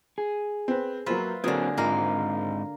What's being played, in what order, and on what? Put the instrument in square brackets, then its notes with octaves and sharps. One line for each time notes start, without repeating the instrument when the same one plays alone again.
[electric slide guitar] G#4
[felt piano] C4 B4
[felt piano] F#3 A#3 C5 [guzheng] F4 B4 E5
[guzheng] D3 G#4 [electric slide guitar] F#3 C4 [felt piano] A#3 F#4 A#4
[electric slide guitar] G#2 C4 D#4 [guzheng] A#3 A#4 [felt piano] F4